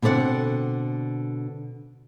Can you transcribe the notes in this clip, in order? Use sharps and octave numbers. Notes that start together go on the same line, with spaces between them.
B2 D3 C4 D5 F#5